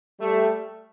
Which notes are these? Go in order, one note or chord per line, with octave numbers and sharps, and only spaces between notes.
G3 A3